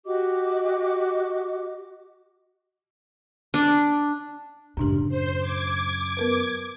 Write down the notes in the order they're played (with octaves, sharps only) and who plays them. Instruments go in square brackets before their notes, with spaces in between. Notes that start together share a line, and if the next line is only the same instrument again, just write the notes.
[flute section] F#4 G4 D#5 D6
[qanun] D4
[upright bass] F#2 C#3 [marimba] A2 D4 G4
[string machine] C5
D6 G#6
[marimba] B3 A#4 B4